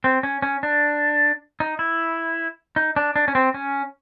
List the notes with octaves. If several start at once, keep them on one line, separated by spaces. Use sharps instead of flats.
C4
C#4
C#4
D4
D#4
E4
D#4
D4
D4
C#4
C4
C#4